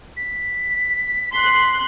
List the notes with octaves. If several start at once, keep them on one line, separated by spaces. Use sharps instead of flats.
B6
C6 F#6 B6